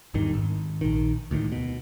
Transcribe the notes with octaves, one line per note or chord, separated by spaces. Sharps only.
G#1 E2 G2 D#3
G#1
A#1 D#3
D2 A2 D#3
B2